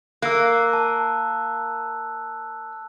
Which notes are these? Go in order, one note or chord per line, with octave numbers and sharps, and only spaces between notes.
A#3 E6 F#6
A5